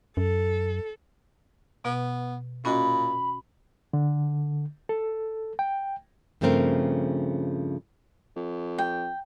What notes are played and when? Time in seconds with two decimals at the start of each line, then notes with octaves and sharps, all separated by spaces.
0.17 F#2 A4
1.85 B2 B3
2.65 A#2 C#4 F#4 D#5 B5
3.93 D3
4.89 A4
5.59 G5
6.41 G2 C#3 F3 A3 C4 A#4
8.36 F2
8.78 G5